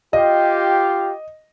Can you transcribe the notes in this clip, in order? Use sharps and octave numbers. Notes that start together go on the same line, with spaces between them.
F4 G4 D#5